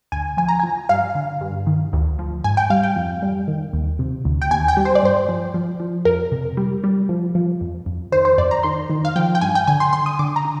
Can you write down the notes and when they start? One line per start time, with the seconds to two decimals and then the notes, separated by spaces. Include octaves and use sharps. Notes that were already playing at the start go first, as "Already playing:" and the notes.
0.12 D2 G#5
0.37 F3 G#5
0.48 A#5
0.59 F3 G#5
0.89 G2 F5
1.15 D3
1.41 G2
1.67 D#3
1.93 D2
2.19 F3
2.44 G#2 G#5
2.57 G5
2.70 G3 F5
2.83 G5
2.96 F2
3.22 G3
3.48 D#3
3.73 D#2
3.99 C3
4.25 D2
4.42 G5
4.51 D#2 G#5
4.68 G5
4.77 G3
4.85 C5
4.95 D5
5.02 G2 C5
5.28 F3
5.54 F3
5.80 F3
6.05 F2 A#4
6.32 C3
6.57 G3
6.84 G3
7.09 F3
7.35 F3
7.61 F2
7.86 F2
8.12 D#3 C5
8.25 C5
8.38 F2 D5
8.51 A#5
8.63 D#3 C6
8.90 D#3
9.05 F5
9.16 F3 G5
9.35 G5
9.41 G2 G#5
9.55 G5
9.67 D3 G#5
9.80 C6
9.93 D3 C6
10.06 D#6
10.19 D3 D6
10.36 A#5
10.45 D3